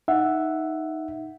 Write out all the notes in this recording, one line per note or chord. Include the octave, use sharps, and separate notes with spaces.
D#4 E5 F#5